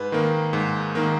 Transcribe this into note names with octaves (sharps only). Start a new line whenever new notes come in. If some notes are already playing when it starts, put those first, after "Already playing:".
Already playing: G#2 B4
D#3 A#3
G#2
D#3 A#3